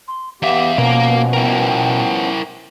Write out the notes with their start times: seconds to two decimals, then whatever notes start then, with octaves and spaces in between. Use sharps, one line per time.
0.08 C6
0.42 E2 B3 G4 E5 F5
0.78 B2 F3 A#3 B3 C#4 A#4
1.33 E4 A#4 G5